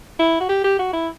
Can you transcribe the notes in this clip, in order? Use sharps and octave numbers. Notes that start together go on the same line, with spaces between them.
E4
F#4
G4
G4
F#4
E4